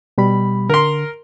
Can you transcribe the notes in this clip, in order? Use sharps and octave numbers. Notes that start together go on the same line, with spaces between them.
B2 G3 B5
D3 A#4 C6